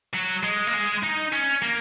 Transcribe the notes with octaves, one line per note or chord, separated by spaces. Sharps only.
F#3
G#3
A#3
G#3
D#4
C#4
A#3